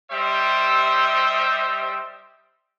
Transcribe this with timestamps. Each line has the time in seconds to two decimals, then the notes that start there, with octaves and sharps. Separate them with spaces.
0.12 G3 G4 C5 D#5 E5